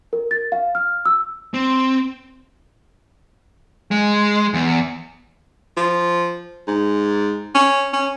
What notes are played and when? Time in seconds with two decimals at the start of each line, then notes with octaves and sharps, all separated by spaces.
0.13 A#4
0.31 A6
0.52 F5
0.75 F6
1.05 E6
1.54 C4
3.91 G#3
4.54 E2
5.77 F3
6.68 G#2
7.55 C#4
7.93 C#4